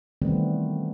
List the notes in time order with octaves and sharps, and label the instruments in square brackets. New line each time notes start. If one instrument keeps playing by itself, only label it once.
[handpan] D#3 E3 G3 A3 B3 C4